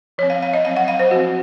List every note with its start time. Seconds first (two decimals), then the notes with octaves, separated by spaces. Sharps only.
0.18 F3 C#5
0.23 C4
0.30 F5
0.43 F5
0.53 D#5
0.65 F#3 C4 F5
0.76 F#5
0.88 F5
0.99 C5
1.11 F3 C4 F#4